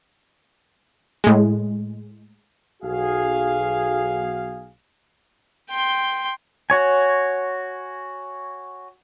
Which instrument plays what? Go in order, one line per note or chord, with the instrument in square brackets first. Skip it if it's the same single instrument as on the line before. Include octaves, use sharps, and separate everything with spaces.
[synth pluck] A2 G#3
[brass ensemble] B1 F#4 G#4 F5
[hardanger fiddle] G5 C6
[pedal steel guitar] F#4 C#5 G#5